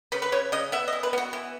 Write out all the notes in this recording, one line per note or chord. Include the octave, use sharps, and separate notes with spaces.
C#3 B4
B4
C#3 C#5
C#3 D#5
B3 E5
D#5
E3
B4
B3 F#4
E3